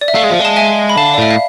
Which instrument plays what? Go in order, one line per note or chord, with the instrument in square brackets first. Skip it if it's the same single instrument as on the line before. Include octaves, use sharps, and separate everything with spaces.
[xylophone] D5
E5
[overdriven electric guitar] A3 [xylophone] F5
[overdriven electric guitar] G#3
F3
[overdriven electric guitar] G#3 [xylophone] A5
[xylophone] E5 G#5
B5
[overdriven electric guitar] D3 [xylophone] F5 A5
[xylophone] D5
[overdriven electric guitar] A2 [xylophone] E5
[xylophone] F5